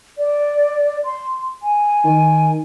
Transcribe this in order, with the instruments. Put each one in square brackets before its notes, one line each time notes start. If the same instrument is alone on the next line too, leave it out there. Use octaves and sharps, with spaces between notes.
[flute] D5
C6
G#5
[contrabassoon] D#3